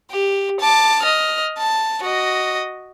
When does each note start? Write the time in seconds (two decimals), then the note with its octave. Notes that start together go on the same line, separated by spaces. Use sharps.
0.10 G4
0.60 A5 D6
1.03 D#5 F6
1.58 A5
2.03 F#4 D#5